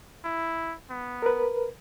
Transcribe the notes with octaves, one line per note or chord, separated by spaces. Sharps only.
E4
B3
A#4 B4